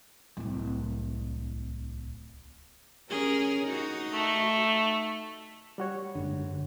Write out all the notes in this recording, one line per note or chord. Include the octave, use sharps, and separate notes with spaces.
D1 C2
C#4 G#4 A#4
D#4 F#4
A3
G3 F#4 C#5
F#1 G#2 D3